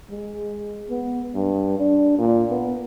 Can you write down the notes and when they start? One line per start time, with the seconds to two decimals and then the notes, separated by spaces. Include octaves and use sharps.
0.10 G#3
0.90 B3
1.35 G2
1.79 D4
2.19 A#2
2.51 B3